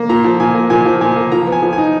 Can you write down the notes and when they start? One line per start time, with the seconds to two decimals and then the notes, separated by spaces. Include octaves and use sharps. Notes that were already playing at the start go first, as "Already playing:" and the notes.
Already playing: A#3
0.09 A#2 A#5
0.24 F3
0.40 A#2 G#5
0.55 A#3
0.70 A#2 G#5
0.86 F3
1.01 A#2 G#5
1.16 A#3
1.32 F3 A#5
1.47 B3
1.52 G#5
1.62 F3
1.73 G#5
1.78 D#4